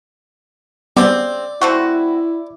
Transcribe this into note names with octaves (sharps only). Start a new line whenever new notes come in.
C#3 G3 B3 C4 D5
A3 C4 E4 F#4 F#5 C#6